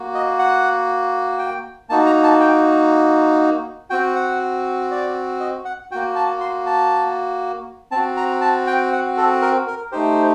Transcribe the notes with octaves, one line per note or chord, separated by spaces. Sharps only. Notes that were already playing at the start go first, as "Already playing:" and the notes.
Already playing: A#3 F#4
D#5
F#5
G5
A#3 D#4 F#4 A5
A#5
A5
G5
C4 F#4 G5
F#5
D5
D#5
F#5
A#3 F#4 G5
A5
C6
A5
C4 F#4 A5
A#5
A5
G5
F#5
A4
A#4
A#4
A3 D#4 G4 C5